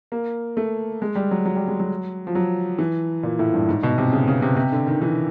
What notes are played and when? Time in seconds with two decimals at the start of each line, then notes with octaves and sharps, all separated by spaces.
0.12 A#3
0.57 A3
1.02 G#3
1.15 G3
1.31 F#3
1.45 F#3
1.56 G3
1.68 G#3
1.80 F#3
2.27 F3
2.35 F#3
2.79 E3
3.23 A#2
3.39 A2
3.54 G2
3.69 G#2
3.83 B2
3.98 C3
4.13 C#3
4.28 C#3
4.42 C3
4.57 C3
4.72 D3
4.87 D#3
5.02 E3